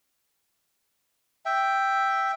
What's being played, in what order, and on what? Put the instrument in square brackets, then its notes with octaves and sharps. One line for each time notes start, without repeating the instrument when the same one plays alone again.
[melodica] E5 G5